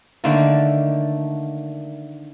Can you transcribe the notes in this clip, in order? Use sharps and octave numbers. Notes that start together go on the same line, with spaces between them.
D3 D#3 A3 A#3